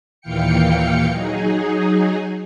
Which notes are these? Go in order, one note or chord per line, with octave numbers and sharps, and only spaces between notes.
D#2 A#2 E3 F5 G5 C#7
F#3 D#4 G#4